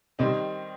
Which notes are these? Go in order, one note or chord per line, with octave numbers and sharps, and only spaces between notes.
C3 D#3 G3 C4 D#4